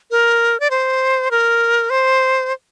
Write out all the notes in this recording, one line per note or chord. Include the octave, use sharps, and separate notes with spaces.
A#4
D5
C5
A#4
C5